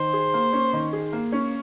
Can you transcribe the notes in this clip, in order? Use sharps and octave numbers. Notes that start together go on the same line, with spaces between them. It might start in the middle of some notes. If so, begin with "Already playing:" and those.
Already playing: D#3 C5
G#4
A#3
C#4
D#3
G#4
A#3
C#4